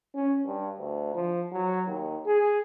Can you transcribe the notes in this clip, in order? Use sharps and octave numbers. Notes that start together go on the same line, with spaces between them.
C#4
G2
D2
F3
F#3
D#2
G#4